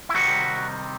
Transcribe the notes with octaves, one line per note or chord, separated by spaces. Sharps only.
E4
C3 D#3 G3 C4 D#4 F#4